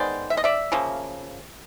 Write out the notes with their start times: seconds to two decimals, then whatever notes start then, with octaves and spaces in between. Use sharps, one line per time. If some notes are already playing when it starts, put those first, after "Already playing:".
Already playing: D#3 G#3 B3 C5 D5
0.30 E5
0.37 D#5
0.44 D5 E5
0.72 C#3 F3 A#3